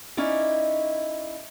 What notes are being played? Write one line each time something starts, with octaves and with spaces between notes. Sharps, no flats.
C#4 D#4 E4 D5